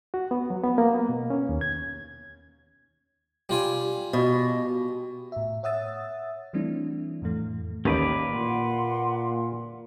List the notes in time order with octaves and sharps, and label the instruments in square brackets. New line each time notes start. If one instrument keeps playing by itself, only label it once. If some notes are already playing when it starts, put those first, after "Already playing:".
[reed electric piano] F#4
B3
F#3
B3
A#3
B3
B2
C#4
D#2
G#6
[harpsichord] G3 F4 G#5
[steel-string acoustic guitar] B2
[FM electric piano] A2 E5
C#5 E5 F#5 D#6 E6 A6
E3 G3 A3 C4 D4 E4
F2 A2 E3 A3
[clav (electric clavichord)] A1 D#2 D#3 [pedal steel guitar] A#3 B4 D5
[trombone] A#2 [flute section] F#5 C6